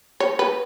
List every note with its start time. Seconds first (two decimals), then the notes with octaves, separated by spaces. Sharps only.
0.20 C#5
0.39 B4